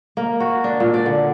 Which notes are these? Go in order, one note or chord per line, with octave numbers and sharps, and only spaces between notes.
A#3
F#4
D4
A#2
D5
D3